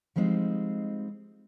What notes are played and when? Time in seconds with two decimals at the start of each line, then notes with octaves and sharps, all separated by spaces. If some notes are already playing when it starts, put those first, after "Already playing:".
0.16 F3 G3 G#3 C4 D#4